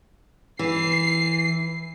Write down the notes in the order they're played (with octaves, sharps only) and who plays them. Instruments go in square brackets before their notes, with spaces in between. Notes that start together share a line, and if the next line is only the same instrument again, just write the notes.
[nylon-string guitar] E3 [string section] C7